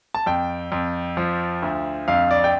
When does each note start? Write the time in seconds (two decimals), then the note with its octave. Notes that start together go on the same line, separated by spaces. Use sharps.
0.14 A5
0.26 F2 G5
0.72 F2
1.17 F3
1.63 D2
2.08 F2 F5
2.31 D5
2.44 G5